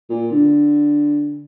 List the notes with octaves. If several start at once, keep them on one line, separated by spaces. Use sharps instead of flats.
A#2
D3